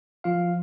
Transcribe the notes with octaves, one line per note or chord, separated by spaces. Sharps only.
F3 F4 F5